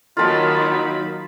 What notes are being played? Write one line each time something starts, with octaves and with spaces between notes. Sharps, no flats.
D#3 F#3 A#3 D#4 F4 A5 B5